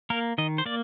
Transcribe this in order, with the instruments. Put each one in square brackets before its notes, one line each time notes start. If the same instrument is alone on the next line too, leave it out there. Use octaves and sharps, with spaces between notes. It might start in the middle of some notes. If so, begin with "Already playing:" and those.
[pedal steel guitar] A#3 A#4
D#3 D#5
C5
A#3 D5